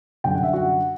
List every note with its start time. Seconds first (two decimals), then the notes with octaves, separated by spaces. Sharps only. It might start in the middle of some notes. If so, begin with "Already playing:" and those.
0.24 F#2 D3 G3 G5
0.35 F#5
0.43 E5
0.53 F#4 F#5